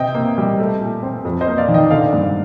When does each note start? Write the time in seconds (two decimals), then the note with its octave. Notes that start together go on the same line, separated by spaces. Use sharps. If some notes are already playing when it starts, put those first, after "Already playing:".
Already playing: C3 D#5 G5
0.15 A#3
0.38 G3
0.60 A3
0.81 A#2
1.03 C4
1.25 F2
1.41 C5 D#5
1.46 A#3
1.58 D5 F5
1.68 D#3
1.74 D#5 G5
1.91 D3 D5 F5
2.13 G2